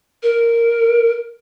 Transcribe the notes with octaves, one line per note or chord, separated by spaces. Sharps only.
A#4